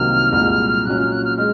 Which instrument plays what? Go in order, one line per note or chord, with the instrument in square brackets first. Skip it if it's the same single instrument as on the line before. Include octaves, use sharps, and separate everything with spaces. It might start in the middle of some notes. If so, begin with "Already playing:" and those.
Already playing: [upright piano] C2 C3 D#3 F#3 A#3 [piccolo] F6
[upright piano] C2 A#2 G#3
[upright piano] A#2 F#3 C#4 [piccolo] F#6
[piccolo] F6
F#6
F6
[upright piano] G#3 [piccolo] F6